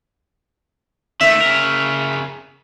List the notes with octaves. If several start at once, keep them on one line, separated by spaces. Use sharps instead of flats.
D#3 A3 E5
C#3 A#4